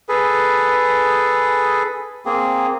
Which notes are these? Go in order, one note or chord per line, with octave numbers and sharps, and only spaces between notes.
G#4 A4 B4
A#3 C4 G#4